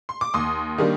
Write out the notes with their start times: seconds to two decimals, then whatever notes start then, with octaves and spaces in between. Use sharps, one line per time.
0.09 C6
0.21 D6
0.34 D#2 C6 D#6
0.78 D#3 G3 A#3 D4